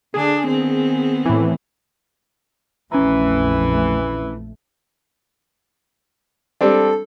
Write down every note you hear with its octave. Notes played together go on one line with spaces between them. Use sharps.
D3 D4 G#4
D#3 B3 C4
A2 E3
A#1 F2 E3 A3 C#4 A#5
G3 C4 D4 A4